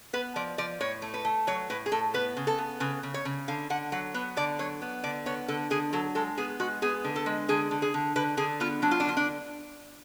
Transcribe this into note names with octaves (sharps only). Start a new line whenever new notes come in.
B3 B4
F3 D5
F3 D5
A2 C#5
A3
B4
A3
F#3 C#5
A2 B4
G#4
A2 A4
B3 B4
C#3
A4
B3
C#3 B4
C#3
C#5
C#3
D3 F5
D3 F#5
F#3 F#5
B3 B4
D3 D5
F#3 C#5
B3
D3 D5
B3 C#5
D3 A4
D3 G#4
F#3 A4
G#3 A4
B3 G#4
G#3 F#4
B3 G#4
D3
A4
G#3
D3 G#4
D3
G#4
D3
D3 B4
D3 G#4
B3 F4
F#3 D4
F4
D4
D3 F4
D4